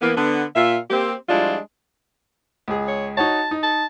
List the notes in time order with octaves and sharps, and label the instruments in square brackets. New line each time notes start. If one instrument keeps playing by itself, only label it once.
[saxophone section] E3 A#3 B3
D3 B3
A#2 F4 E5
A#3 C4 G4
F3 G3 G#3 D4 E4 F4
[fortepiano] C#2 G#4
[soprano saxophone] C#5
[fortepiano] D#4 F#4 C#5 [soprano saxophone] A5
[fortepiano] D#4
[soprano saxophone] A5